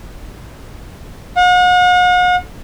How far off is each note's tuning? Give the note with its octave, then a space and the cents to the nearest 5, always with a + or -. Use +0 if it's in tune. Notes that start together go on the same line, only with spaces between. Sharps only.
F#5 -45